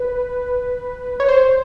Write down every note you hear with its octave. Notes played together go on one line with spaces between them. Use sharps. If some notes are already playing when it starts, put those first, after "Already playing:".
Already playing: B4
C#5
C5